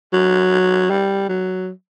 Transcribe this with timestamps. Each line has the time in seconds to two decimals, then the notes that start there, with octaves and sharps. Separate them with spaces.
0.13 F#3
0.90 G3
1.29 F#3